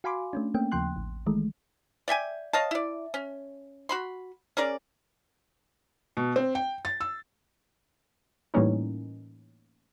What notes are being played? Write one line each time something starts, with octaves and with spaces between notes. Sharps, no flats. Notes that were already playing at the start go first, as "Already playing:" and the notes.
F#4 F5 G#5 B5 C6 D6
A3 C#4 D4
A3 A#3 C4 C#4 G5
D#2 C#3 F3 G5 C6 F#6
A1
D#3 E3 G#3 A3
D5 E5 G5 G#5
C#5 D#5 F5 A5
E4 D5
C#4
F#4 B5 C6
C#4 G#4 A#4 D5
B2
C4
G5
A6
E6
A2 E3 G3 A#3 C#4 D#4